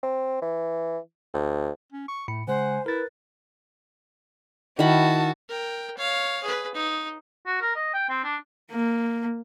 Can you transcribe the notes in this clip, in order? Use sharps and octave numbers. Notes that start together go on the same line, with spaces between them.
C4
E3
D2
C#4
C#6
A2 A3 B5 C#7
C#3 G#3 C5 F#5 G#5
E4 A#4 B4 A6
D#3 E4 F#4 A5 B5
A#4 G5
C#5 F5
G#4 B4
D#4
F#4
A#4
D#5
G5
C4
D4
A#3